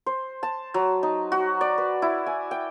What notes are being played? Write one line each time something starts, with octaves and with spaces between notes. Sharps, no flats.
C5
A5
F#3
D#4
F#4
D5
B4
E4
G#5
G5